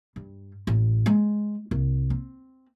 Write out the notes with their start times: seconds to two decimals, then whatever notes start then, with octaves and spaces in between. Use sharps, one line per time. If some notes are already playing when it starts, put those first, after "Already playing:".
0.16 G2
0.67 A1
1.06 G#3
1.71 C2
2.10 C4